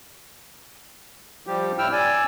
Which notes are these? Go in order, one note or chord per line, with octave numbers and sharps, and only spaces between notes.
F3 G3 G4
A2 E4 G5 E6 F6
D5 G#5 E6